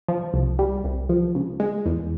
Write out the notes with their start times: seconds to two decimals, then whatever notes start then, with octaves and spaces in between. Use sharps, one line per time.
0.08 F3
0.34 C2
0.59 G3
0.84 C2
1.09 F3
1.35 C#2
1.60 G#3
1.86 E2